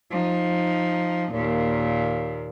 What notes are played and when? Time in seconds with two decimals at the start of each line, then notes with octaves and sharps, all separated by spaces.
0.11 F3 D#4
1.32 D#2 A#2